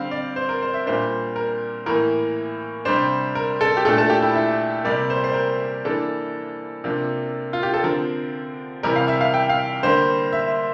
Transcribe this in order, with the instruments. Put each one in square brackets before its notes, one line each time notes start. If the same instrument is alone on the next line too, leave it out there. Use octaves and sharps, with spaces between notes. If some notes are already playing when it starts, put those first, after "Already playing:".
Already playing: [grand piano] D3 G3 C4 F5
D5
C5
A#4
C5
E5
A#2 G3 A#3 D4 C5
A#4
A2 E3 A#3 A#4
C3 G3 D4 C5
A#4
A4
G4
A#2 A3 D4 A4
A4
G4
E4
E4
C3 G3 A#3 D5
C5
C5
A#4
E3 A#3 D4 A4
C3 F3 A#3 D4
F4
G4
A4
D3 F3 C4 A#4
C3 E3 G3 A#4
F5
E5
F5
G5
F5
D3 G3 A#3 C5
E5